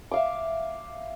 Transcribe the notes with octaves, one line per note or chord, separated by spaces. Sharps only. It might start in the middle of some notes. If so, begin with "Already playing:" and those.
E5 F5 D6